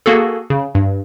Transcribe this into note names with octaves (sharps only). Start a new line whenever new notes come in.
A#3 F#4 G#4 A4
C#3
G2